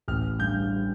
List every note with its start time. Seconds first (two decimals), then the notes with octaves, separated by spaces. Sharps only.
0.08 A1 F6
0.40 G2 G3 G6